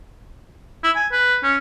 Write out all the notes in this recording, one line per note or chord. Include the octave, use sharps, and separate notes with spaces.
E4
G#5
B4
C#4